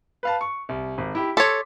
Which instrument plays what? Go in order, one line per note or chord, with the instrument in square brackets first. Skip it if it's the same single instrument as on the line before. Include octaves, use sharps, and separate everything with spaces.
[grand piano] B4 F5 A5
C#6
C2
G#1
E4 G4
[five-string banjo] A4 C#5 [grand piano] C6 D6 B6